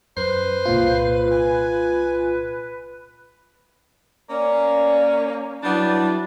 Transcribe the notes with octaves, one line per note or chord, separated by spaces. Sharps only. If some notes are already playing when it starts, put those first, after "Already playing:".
F#2 B4 C5
C2 A#2 F4
G#5
A#3 C#4 D5
F#3 G3 B3 D4 E4